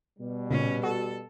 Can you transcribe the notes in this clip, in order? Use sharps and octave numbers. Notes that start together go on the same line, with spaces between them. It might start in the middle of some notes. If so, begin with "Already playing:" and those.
B2 G3
A#2 C#3 C#4
F#4 A4